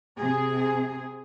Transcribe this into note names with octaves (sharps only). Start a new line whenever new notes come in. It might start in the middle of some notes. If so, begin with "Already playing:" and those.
C3 G#4